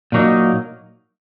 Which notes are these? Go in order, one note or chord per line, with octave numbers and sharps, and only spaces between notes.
A#2 F#3 A#3 D#4